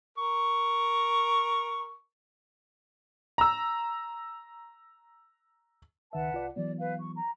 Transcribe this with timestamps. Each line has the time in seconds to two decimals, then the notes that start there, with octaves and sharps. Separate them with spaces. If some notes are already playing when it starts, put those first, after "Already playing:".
0.18 A#4 C#6
3.38 A#5 E6
6.13 C#2 D#3 B4 E5 F#5 A5
6.32 C2 F4 D5
6.56 E3 F#3 B3 D5
6.80 B4 F5
7.00 C#6
7.15 A#5